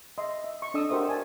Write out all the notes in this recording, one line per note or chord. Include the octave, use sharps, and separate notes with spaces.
D#5 E5 C6
E5
C#6
D4 A4 D#5 D#6 E6
F#4 G4 A#4 C5 E5 D#6
D5 G#5 A5